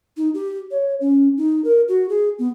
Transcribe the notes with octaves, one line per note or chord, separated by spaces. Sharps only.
D#4
G4
C#5
C#4
D#4
A#4
F#4
G#4
B3